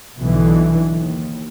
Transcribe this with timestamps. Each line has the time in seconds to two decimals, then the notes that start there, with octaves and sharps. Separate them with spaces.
0.19 B1 B2 D3 E3
0.94 D#2